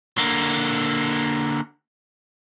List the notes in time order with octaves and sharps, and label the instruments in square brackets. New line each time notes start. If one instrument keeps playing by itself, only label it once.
[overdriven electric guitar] D3 A#3